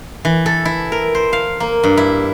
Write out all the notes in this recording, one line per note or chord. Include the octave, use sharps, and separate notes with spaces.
E3
A4
E4
A#4
C5
F5
A#3
G2
E4